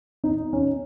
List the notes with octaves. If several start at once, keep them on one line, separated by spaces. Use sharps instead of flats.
D#4
C#4